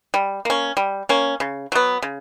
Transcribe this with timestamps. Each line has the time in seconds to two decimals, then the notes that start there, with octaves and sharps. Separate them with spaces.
0.14 G3
0.45 A#3 C#4
0.77 G3
1.09 A#3 C#4
1.40 C#3
1.72 F#3 B3
2.02 C#3